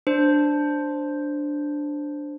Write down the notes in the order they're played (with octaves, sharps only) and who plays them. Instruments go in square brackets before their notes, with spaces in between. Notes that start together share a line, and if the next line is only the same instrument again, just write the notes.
[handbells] D4 C5